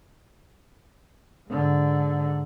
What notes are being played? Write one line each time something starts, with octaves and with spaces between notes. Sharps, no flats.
G#2 D3